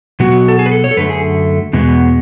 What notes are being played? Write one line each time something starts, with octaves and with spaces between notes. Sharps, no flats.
B2 F#3 B3 F#4
A4
G#4
B4
A4
C#5
A4
F#2 D3 A3 B4
G#4
E2 B2 G#3 B3